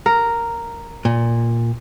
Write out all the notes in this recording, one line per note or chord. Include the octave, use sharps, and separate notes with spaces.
A#4
A#2